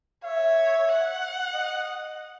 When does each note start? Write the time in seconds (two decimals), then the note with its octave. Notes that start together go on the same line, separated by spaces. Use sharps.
0.24 C#5 E5
0.89 F#5
1.54 D#5